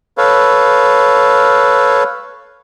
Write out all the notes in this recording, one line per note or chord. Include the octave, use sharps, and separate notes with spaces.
A4 B4 C#5 F5